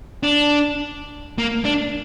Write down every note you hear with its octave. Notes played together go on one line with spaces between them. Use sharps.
D4
A#3
D4